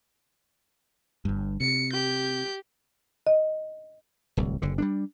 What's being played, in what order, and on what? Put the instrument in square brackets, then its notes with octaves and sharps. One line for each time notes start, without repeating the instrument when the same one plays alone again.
[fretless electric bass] G1 G2
[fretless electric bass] C3 [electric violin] C#7
[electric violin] G4 G6
[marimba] D#5
[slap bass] D1 C2
F#1 D3
G3 A3 D4